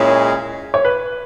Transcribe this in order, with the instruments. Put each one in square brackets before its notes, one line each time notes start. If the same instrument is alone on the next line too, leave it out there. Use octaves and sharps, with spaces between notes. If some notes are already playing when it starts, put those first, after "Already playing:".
Already playing: [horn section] A#2 G#3 C#4 E4 [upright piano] C#5
[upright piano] C#5
B4